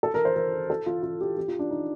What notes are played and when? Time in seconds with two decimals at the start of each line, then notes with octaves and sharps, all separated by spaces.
0.03 A4
0.14 A#4
0.25 C5
0.36 A#4
0.70 A4
0.86 F4
1.03 F4
1.21 G4
1.37 G4
1.48 F4
1.59 D4
1.70 D#4